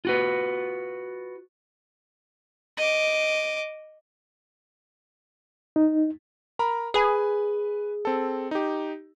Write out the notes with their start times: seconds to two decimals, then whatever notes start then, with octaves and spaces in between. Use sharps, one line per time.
0.05 F4 F#4 B4
2.77 D#5 D6
5.76 D#4
6.59 A#4 A#5 B5
6.94 G#4 B4 G#5 B5
8.05 C4 A4
8.51 D#4 G4